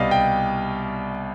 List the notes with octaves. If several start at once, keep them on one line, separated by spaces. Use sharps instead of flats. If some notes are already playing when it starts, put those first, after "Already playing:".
Already playing: C2 B2 G3 D5 D#5 F5
G5